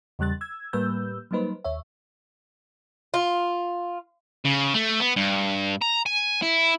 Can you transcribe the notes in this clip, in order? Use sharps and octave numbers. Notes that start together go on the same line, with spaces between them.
E2 C#3 G3 F#6 A6
E6 G#6
A2 G3 A#3 B4 E6 G6
F#3 G3 A#3 D#4 B4 C5
D#2 C#5 E5
F4
C#3
A3
B3
G2
A#5
G#5
E4